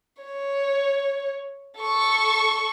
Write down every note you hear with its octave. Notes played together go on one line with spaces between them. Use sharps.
C#5
A4 C#6